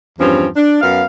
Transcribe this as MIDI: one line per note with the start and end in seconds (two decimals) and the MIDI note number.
0.19 0.47 40
0.19 0.47 43
0.19 0.47 53
0.19 0.47 60
0.19 0.47 61
0.56 0.77 62
0.81 1.03 42
0.81 1.03 59
0.81 1.03 77